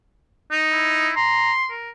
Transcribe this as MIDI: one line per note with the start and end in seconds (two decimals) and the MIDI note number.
0.52 1.10 63
0.72 1.15 64
1.16 1.52 82
1.16 1.70 84
1.70 1.90 70